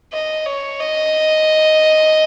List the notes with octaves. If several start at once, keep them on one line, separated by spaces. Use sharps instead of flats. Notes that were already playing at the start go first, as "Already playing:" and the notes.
D#5
C#5
D#5